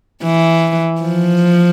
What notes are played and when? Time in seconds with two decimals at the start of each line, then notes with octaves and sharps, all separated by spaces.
0.23 E3
1.01 F3